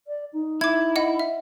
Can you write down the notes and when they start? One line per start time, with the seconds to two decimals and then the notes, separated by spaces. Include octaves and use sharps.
0.07 D5
0.33 D#4
0.61 E4 D6 G#6
0.96 D#5 F#5
1.19 E5